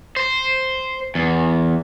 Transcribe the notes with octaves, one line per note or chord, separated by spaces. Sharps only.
C5
E2